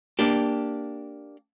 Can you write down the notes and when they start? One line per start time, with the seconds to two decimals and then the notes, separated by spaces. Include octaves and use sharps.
0.19 A#3 D4 G4